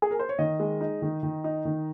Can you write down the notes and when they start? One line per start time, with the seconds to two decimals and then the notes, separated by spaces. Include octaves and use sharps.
0.02 G#4
0.11 A#4
0.19 C5
0.29 C#5
0.39 D#3 D#5
0.60 G#3
0.81 D#4
1.02 D#3
1.23 D#3
1.44 D#4
1.65 D#3